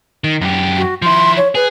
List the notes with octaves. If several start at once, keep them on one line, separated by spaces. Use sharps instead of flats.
D#3
F#2 G4
F#4
F3 E4 C6
C#5
G#4 B4